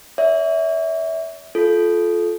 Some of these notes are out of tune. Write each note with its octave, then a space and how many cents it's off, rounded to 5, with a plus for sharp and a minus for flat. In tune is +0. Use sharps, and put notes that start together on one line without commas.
C#5 +40 E5 -20
F4 +0 A4 -25